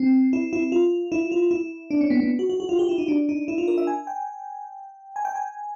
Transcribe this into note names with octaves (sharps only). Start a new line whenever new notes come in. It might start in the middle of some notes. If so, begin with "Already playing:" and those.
Already playing: C4
E4
E4
F4
E4
F4
E4
D4
C#4
B3
B3
F#4
F#4
F#4
F4
G4
E4
D#4
D4
D#4
E4
F4
A#4
E5
G#5
G5
G#5
G5
G#5